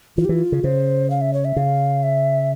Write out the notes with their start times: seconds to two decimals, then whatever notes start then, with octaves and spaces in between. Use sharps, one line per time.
0.17 E3 F4
0.25 G4
0.29 E3 F4
0.52 C#3
0.64 C#3 C5
1.10 F5
1.21 E5
1.34 C#5
1.45 E5
1.56 C#3 F5
2.03 E5